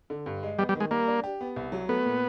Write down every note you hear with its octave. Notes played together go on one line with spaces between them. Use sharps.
D3
G2
G#3
G3 B3
G3
D#3
G#3
G3 A#3
D4
G4
B3
C2
F#3
A3 B3
A#2